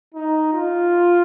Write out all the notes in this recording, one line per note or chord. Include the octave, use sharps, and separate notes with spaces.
D#4
F4